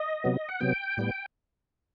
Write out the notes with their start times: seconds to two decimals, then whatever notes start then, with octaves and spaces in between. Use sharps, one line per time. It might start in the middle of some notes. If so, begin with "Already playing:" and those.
Already playing: D#5
0.24 C3 F#3 B3
0.49 F#5
0.61 C3 F#3 B3 G5
0.97 A2 G3 B3